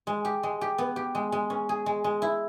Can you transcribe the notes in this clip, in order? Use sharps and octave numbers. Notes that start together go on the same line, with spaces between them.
G#3
G4
G#3
G4
B3
G4
G#3
G#3
C#4
G#4
G#3
G#3
E4